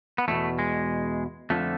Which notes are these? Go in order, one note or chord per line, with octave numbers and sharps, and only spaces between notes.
B3
E2 B2 A3
G#3
F2 D3 F3 A3